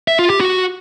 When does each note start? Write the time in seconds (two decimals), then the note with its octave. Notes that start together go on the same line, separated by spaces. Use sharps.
0.08 E5
0.19 F4
0.30 G4
0.41 F#4